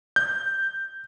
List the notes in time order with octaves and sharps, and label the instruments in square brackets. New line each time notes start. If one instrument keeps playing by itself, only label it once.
[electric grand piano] G6